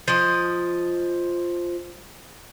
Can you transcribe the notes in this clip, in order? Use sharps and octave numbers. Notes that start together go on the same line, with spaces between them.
F3 D#5